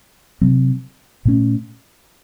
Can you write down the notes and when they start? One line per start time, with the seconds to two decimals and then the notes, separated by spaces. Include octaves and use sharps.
0.41 C3 F#3 C4
1.25 A#2 A3 C#4